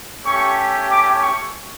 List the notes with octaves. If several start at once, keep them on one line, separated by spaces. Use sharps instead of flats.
A3 C#4 G4 C#6
D6
C#6